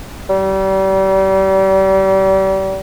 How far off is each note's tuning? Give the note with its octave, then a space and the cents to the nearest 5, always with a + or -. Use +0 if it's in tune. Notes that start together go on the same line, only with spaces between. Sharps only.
G3 -35